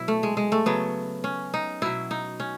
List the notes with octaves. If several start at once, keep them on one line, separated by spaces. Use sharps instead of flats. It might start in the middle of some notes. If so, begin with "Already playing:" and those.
Already playing: B2 F#3 E4
A3
G#3
G#3
A3
C#3 F#3 B3
C#4
D#4
B2 F#3 E4
D#4
C#4